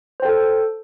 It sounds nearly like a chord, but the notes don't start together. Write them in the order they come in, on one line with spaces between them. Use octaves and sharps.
C5 G5 A4